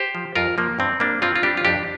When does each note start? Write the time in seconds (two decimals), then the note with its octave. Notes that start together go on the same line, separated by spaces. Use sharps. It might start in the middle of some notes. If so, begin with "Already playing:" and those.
Already playing: G4 C5
0.15 F3
0.35 F2 F4 A#4
0.58 F3 A#3
0.79 G2 C4
1.00 G3 A#3 D4
1.22 G2 C4 F4
1.36 F4
1.43 G3 D4 G4
1.57 F4
1.65 F2 D4 G4